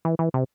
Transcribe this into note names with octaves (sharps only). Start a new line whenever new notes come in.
E3
E3
C3